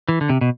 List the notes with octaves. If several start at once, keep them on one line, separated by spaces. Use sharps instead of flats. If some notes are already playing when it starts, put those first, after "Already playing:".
E3
D3
C3
B2